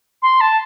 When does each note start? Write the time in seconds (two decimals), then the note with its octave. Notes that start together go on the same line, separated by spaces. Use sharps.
0.22 C6
0.41 A5